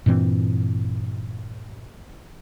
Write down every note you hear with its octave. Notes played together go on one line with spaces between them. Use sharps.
G2 A#2 E3 C4